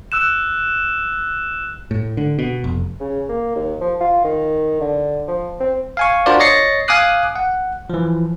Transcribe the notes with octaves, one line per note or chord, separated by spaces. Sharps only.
E6 F#6 E7
A2
D3
B2
F1
C#3
A#3
D#2
F3
F4
D#3
D3
F3
C4
F5 G#5 C#6
D4 F4 F#4 A#4 C5 D5
C#5 D#5 A6 A#6 C7 C#7
F5 G#5 D6 D#6 F#6 C7
F#5
E3 F3